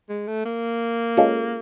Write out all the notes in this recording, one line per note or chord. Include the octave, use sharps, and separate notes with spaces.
G#3
A3
A#3
G#3 C#4 F4 A4